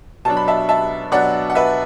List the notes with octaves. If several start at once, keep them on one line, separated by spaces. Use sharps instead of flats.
B2 F#3 D4 A5
B5
E5 A5
E5 A5
B2 F#3 D4 D5 F#5
F#5
B4 E5